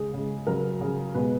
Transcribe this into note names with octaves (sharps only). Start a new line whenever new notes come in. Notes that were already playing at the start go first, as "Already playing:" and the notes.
Already playing: C#3 G#3 G#4
C#3 G#3
C#3 F#3 A#4
C#3 F#3
B2 G#3 B4